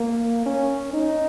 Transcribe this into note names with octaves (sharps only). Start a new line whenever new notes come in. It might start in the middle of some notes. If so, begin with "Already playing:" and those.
Already playing: A#3
C#4
D#4